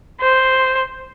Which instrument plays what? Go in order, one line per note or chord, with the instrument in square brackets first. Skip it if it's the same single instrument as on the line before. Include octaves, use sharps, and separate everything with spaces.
[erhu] C5